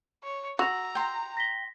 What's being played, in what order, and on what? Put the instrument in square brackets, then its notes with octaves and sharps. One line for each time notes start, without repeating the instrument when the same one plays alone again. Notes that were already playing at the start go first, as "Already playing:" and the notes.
[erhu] C#5
[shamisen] F#4 [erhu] A#5 [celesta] E6 A#6 F7
[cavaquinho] G5 C6
[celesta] A#6 B6 G7